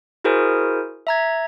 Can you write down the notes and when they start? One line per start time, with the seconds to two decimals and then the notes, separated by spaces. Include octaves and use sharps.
0.24 E4 F#4 G#4 A#4 C5 G#5
1.07 E5 A#5 G#6